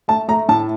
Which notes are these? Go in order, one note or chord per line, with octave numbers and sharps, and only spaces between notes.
A3 A5
A3 A#5
A2 A5